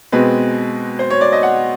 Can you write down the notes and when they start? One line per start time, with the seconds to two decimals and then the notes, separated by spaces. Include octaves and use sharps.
0.12 B2 G#3 C4 B4
0.99 C5
1.10 C#5
1.21 D5
1.32 D#5
1.43 F#5